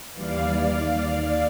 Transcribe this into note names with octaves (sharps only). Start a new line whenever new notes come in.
D#2 E3 G3 D5 F5